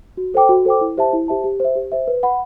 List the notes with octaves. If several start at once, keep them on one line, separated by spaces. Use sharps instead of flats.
F#4
A4 C5 G5 D6
F#4
A4 C5 G5 D6
E4
G4 C5 E5 A5
E4
G4 C5 E5 A5
G4
C5 E5
G4
C5 E5
B4
F#5 B5